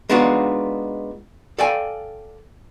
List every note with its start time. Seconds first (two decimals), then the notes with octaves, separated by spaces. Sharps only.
0.09 G#3 B3 D4 D#4 F4 F#4
1.58 A4 D5 F5 G5 G#5